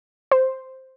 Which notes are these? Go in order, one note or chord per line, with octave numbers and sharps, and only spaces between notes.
C5